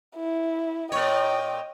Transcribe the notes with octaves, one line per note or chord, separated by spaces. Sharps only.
E4
A#2 C#5 D#5 G5